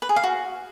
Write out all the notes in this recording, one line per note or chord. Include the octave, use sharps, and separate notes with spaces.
B4
G#4
F5
F#4